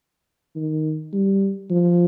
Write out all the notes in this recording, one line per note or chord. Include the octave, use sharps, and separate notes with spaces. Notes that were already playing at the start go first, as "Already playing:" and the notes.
D#3
G3
F3